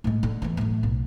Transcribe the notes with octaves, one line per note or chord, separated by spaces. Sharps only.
A2 G#3
D3
E2 E3
F#2 A2
B1